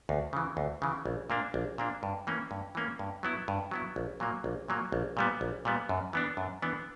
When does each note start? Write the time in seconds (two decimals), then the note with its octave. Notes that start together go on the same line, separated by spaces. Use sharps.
0.09 D2
0.33 C#3 E3
0.57 D2
0.82 C#3 E3
1.06 A#1
1.30 A#2 A#3 D4
1.54 A#1
1.78 A#2 A#3 D4
2.03 G2
2.27 E3 A#3 C#4
2.51 G2
2.75 E3 A#3 C#4
2.99 G2
3.23 F#3 B3 E4
3.48 G2
3.71 F#3 B3 E4
3.96 A#1
4.20 A#2 F#3 A#3
4.44 A#1
4.68 A#2 F#3 A#3
4.92 A#1
5.17 A#2 G3 B3
5.41 A#1
5.65 A#2 G3 B3
5.89 F#2
6.13 E3 B3 D4
6.37 F#2
6.62 E3 B3 D4